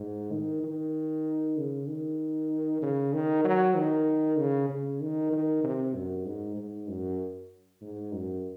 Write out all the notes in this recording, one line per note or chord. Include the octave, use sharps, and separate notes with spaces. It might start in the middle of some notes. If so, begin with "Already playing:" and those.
Already playing: G#2
D#3
D#3
C#3
D#3
C#3
D#3
F#3
D#3
C#3
C#3
D#3
D#3
C3
F#2
G#2
G#2
F#2
G#2
F#2